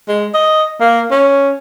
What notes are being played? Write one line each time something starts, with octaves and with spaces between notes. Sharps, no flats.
G#3
D#5
A#3
C#4